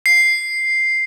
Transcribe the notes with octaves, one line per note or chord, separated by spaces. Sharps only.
C7